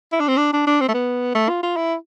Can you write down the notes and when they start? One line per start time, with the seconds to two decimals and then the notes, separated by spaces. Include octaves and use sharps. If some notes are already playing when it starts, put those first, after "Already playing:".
0.13 E4
0.20 D4
0.28 C4
0.37 D4
0.53 D4
0.67 D4
0.81 C4
0.89 A3
0.94 B3
1.35 A3
1.49 F4
1.63 F4
1.76 E4